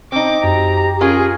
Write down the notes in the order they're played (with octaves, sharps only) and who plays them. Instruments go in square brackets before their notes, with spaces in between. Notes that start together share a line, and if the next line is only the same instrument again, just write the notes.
[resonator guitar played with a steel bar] C4 D#4 [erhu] D6
[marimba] F#2 [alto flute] G4 [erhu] A#5
[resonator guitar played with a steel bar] C#4 F4 A#4 [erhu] G#4